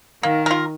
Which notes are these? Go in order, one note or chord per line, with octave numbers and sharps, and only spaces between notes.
D#3 A#3
F4 A#4